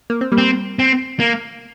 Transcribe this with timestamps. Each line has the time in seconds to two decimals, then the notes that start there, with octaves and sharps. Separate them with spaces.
0.10 A#3
0.21 C4
0.32 G3 A#3
0.38 C4
0.79 C4
1.20 A#3